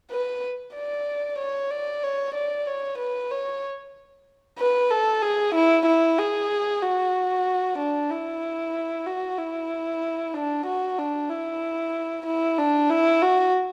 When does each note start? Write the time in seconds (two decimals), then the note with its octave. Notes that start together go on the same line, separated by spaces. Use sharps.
0.11 B4
0.75 D5
1.39 C#5
1.71 D5
2.03 C#5
2.35 D5
2.67 C#5
2.98 B4
3.30 C#5
4.59 B4
4.91 A4
5.22 G#4
5.55 E4
5.86 E4
6.19 G#4
6.82 F#4
7.78 D4
8.10 E4
9.06 F#4
9.38 E4
10.34 D4
10.66 F#4
10.98 D4
11.30 E4
12.26 E4
12.58 D4
12.90 E4
13.22 F#4